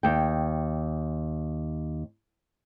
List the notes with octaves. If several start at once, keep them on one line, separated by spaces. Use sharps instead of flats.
D#2 G5